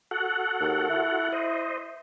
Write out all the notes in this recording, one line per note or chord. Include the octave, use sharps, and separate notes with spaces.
F#4 A4 F#5
D#2
E4
C5 D#5